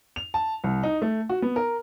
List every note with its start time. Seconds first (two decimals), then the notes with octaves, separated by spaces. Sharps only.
0.16 F7
0.34 A5
0.64 C2
0.83 D#4
1.02 A3
1.29 F#4
1.42 B3
1.56 A#4